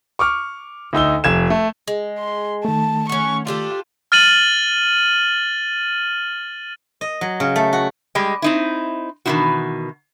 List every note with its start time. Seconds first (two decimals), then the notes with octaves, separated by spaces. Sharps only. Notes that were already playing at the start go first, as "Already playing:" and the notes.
0.19 C#6 D6 F6
0.93 D2 D#4 E6 G7
1.24 F1 G#6 E7
1.50 A3
1.88 G#3
2.19 C6
2.65 D#3 A3 A5
3.09 C#4 F#5 C#6
3.47 D4 F4 G4 A4
4.12 F6 A6 D#7 F#7
7.01 D#5
7.21 F#3
7.40 C#3
7.56 A3
7.73 F#4
8.15 G3 G#3 G4 D#5
8.42 C4 D#4 E4
9.25 B2 D#3 E3 C4 E4 F#4